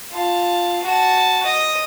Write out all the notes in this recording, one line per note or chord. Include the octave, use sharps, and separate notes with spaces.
F4 A5
F#4 A5
D#5